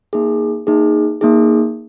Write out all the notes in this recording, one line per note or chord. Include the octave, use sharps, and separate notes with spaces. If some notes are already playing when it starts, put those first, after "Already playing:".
A#3 D#4 G#4
A#3 D#4 G#4
A#3 D#4 G#4